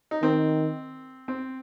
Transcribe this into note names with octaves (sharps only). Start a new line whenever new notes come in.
D#4
D#3 C4
C4